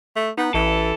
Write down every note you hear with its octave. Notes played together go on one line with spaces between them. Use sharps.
A3
B3 D#4
A1 E3 A4